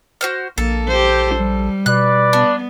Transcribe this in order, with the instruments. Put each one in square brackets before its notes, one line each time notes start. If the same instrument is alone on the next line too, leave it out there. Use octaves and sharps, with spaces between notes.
[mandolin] F#4 C5 F6
[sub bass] A#1 [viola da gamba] A#3 [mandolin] A4
[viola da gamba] G4 C5
G3
[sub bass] B2 [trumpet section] B4 D5 [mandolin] F#6
[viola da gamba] B3 [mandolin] D4